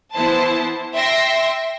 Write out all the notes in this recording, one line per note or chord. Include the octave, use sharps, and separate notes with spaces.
E3 B3 E4 C5 A5
E5 G5 C6 A#6